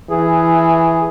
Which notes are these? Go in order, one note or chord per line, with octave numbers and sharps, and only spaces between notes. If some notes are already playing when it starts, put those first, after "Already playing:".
E3 G#4